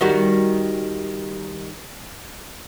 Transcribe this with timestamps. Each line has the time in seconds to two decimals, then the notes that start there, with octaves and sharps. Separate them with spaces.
0.01 D#3 G3 F#4